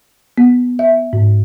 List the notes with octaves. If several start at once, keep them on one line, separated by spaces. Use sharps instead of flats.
B3
E5
G#2